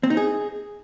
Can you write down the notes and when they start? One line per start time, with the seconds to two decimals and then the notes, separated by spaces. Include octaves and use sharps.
0.03 C4
0.10 D#4
0.17 G#4